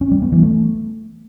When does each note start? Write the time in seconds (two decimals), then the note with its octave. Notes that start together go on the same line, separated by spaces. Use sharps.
0.01 C#4
0.11 G3
0.22 B3
0.32 E3
0.42 A3